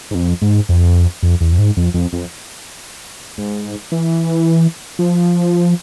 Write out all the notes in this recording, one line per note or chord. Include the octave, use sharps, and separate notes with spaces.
G#2
F2
G#2
F2
F2
E2
F2
G#2
F2
F2
F2
G#2
E3
F3